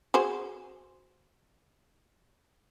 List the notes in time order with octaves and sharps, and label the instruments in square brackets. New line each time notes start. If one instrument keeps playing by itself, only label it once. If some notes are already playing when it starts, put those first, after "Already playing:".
[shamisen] F#4 G#4 C5